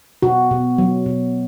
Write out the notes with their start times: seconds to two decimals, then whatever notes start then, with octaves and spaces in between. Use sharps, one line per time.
0.22 B2 F#4
0.51 B2
0.78 F#3
1.06 B2